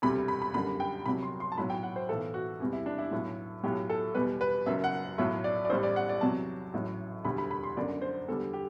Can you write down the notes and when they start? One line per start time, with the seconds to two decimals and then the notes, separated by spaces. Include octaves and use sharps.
0.02 E1 D2 C3 G3 B5
0.28 B5
0.42 B5
0.54 G1 F#2 D3 G3 B5
0.80 G5
1.06 C2 C3 F#3 B5
1.23 C6
1.40 C6
1.52 A5
1.57 B1 A2 F#3 B5
1.70 G5
1.83 F#5
1.96 C5
2.09 B1 A2 E3 A4
2.34 F#4
2.60 E2 C3 G3
2.73 E4
2.86 D4
2.98 E4
3.11 B1 A2 F#3
3.64 B1 A2 F#3 G4
3.90 A4
4.15 E2 B2 G3 B4
4.41 B4
4.66 F#1 F#2 F#3 E5
4.84 F#5
5.18 B1 A2 F#3 E5
5.44 D5
5.65 D5
5.69 A1 A2 G3 C5
5.83 D5
5.96 F#5
6.09 D5
6.21 E2 C3 F#3 A5
6.73 A1 A2 F#3
7.25 E1 D2 D3 G3 B5
7.38 B5
7.51 B5
7.63 C6
7.76 G1 F#2 D3 D5
8.02 C5
8.28 E2 D3 G3 A4
8.53 G4